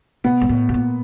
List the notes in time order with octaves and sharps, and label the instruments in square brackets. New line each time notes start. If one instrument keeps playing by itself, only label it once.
[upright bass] B2 [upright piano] B3
[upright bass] G#2
A2
B2
A#2